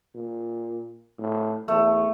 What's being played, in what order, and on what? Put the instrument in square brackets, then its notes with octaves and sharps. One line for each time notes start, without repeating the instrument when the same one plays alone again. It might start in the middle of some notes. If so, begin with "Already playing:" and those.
[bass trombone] A#2
A2
[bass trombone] E2 [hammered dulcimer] A3